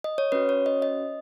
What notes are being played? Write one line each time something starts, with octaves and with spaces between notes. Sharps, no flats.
D#5
C#5
C#4 F#4 B4
C#5
D#5
D#5